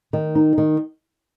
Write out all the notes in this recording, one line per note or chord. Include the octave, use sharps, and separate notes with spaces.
D#3
D#4
D#3